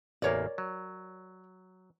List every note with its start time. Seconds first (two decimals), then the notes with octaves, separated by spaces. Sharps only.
0.22 A1 E2 A#3 A#4 C#5 D5
0.58 F#3